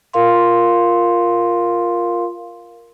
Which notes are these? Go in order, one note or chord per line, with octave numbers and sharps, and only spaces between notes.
F4 A#4 F5 C6